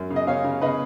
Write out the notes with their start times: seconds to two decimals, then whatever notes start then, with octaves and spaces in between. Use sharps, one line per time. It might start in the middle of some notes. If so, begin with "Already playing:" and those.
Already playing: F#2
0.10 C#3
0.16 D#5
0.27 C#3 C#5 F5
0.44 C#3
0.61 C#3 B4 D#5